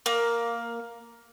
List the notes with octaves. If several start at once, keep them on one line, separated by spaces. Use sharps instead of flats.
A#3